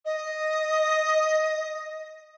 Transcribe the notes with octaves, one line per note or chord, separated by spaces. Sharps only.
D#5